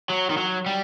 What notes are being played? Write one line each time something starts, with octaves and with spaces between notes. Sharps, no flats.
F#3
D#3
F#3
G3